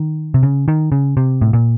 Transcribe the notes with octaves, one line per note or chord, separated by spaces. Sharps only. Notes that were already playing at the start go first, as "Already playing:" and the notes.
Already playing: D#3
C3
C#3
D#3
C#3
C3
A2
A#2